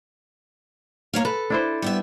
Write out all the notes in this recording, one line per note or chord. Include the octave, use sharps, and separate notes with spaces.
A#3 C#5 F5
A4 B4
D4 E4 C5
G3 B3 E5